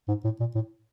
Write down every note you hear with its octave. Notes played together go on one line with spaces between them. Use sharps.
G#2
A2
A#2
A2